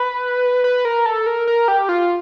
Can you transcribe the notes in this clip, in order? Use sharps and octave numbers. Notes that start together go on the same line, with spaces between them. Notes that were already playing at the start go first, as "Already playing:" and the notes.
Already playing: B4
B4
A#4
A4
A#4
A#4
G4
F4